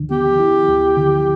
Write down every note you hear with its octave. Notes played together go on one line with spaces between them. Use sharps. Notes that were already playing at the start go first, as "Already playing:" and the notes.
Already playing: D2 D3 D4
B3 G4
E4
D2
D3